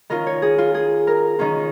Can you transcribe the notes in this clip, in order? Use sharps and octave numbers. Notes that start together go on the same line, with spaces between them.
D#3 C#4 F4 A#4
C#5
G#4
F4
G#4
A#4
D#3 C#4 F4